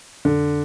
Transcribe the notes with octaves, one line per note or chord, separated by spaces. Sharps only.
F2 D3